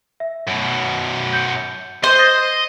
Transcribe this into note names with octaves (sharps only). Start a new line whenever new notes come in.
E5
F#2 B2
G6 C#7
C5 D#5
D#6 A6 A#6